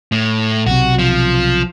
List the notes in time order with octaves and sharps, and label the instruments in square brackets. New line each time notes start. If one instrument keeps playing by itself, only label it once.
[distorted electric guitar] A2
[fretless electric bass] B1 C3 [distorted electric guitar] F#4
[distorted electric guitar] F3